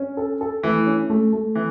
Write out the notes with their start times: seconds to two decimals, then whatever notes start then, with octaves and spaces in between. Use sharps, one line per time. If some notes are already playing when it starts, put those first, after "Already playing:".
Already playing: C#4
0.17 A4
0.41 A4
0.63 E3 A3
0.86 C#4
1.10 A3
1.33 A3
1.55 E3